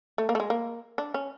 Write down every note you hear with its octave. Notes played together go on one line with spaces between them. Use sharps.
A3
A#3
A3
G#3
A#3
D4
C#4